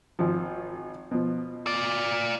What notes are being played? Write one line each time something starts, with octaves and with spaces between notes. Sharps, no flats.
G#1 F3
B2 F3
F4 D5